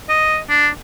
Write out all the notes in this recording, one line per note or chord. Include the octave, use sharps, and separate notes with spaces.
D#5
D4